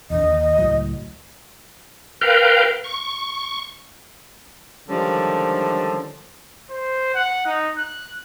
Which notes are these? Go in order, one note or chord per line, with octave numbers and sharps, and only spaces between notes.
E2 D3 D#5
D#2
C#2 A2 F#3
A#4 B4 F5 G5
C#6
D3 D#3 F3 G3 G#3 C#4
C5
F#5
D#4
F#6